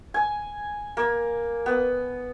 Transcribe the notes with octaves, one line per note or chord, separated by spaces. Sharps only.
G#5
A#3
B3